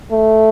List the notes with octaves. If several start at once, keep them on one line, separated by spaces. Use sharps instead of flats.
A3